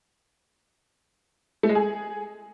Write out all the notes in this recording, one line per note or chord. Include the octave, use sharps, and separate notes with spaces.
A3
G#3
G#4